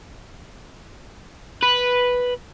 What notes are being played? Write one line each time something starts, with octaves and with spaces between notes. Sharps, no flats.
B4